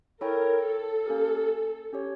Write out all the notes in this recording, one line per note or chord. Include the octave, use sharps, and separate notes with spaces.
E4 A4 A#4 C#5 G5
A4
A#3 C#4 G4 A#4
C#4 G4 C#5